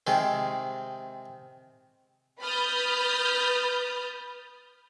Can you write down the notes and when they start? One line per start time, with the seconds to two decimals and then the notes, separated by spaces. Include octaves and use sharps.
0.07 C3 D#3 G#3
2.41 B4 B5 D#6 F6 G6 A6